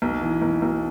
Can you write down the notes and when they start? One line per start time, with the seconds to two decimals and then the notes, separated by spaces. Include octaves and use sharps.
0.02 B1
0.22 E3
0.42 B1
0.62 B1